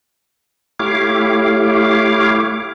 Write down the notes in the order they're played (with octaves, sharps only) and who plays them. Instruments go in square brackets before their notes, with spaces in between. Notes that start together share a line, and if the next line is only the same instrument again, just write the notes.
[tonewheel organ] A3 E4 G4 C#5 F5 D6